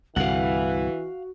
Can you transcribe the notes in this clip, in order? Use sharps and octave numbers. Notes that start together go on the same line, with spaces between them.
C2 G2 D3 E3 F#4 F5 F#5